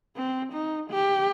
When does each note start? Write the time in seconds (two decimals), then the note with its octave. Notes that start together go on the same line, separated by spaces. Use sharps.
0.17 C4
0.53 D#4
0.91 G4